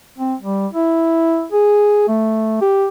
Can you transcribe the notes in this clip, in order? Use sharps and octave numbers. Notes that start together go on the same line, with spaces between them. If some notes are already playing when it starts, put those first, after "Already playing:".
C4
G3
E4
G#4
A3
G4